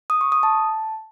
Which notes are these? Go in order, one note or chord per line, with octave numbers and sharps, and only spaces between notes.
D#6
C#6
D#6
A5